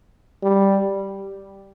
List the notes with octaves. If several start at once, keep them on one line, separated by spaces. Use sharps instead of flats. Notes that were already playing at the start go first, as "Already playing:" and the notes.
G3